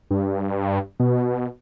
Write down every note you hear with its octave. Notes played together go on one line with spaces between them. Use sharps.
G2
B2